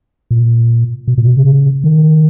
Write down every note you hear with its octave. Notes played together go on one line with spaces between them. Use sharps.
A#2
B2
A#2
B2
C#3
D#3